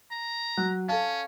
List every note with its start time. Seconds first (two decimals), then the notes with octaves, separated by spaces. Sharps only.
0.11 A#5
0.57 F#3 F#6
0.89 C#4 A4 F5 A5